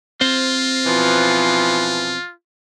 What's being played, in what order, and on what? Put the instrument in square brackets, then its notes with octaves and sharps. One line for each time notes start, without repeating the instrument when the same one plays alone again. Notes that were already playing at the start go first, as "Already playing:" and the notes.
[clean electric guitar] C4 C5 [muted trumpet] F4
[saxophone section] B2 E3 F3